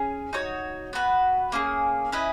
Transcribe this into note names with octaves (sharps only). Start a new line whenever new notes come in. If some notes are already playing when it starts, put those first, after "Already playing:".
Already playing: C#4 G#4
D#4 F#4 C#5
B3 F#4 B4
A#3 C#4 G#4
C#4 E4 B4 D#5